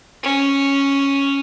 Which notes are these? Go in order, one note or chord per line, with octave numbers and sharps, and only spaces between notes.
C#4